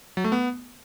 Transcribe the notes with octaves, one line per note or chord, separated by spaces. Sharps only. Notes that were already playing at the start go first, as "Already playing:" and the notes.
F#3
A3
B3